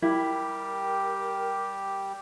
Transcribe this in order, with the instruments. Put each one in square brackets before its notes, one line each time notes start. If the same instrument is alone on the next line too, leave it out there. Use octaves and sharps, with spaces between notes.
[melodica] G3 G4 [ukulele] E4 [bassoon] A#4